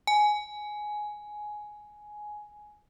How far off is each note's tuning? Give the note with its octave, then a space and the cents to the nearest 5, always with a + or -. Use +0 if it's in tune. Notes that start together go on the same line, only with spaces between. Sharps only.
G#5 +10